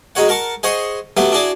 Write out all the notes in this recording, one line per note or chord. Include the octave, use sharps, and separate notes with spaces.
G#3 D#4 F#4 C#5 F#5
A#4 F#5 A5 C#6
G#4 C5 D#5 F#5 C#6
F#3 A3 B3 G4 F#5
D4 E4 F#4 G#4 D5